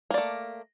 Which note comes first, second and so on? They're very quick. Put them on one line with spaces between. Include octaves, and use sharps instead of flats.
A#3 D5 A3